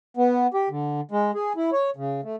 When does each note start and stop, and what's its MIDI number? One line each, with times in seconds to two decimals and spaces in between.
0.17 0.47 59
0.54 0.69 67
0.70 1.01 50
1.11 1.31 56
1.35 1.53 68
1.56 1.70 64
1.73 1.90 73
1.96 2.21 49
2.23 2.36 57